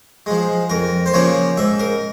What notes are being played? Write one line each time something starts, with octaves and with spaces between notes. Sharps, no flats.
F3 G#3
F2 A#4
C5
C#3 F3 A#3 C#5
G#2 E5
A#4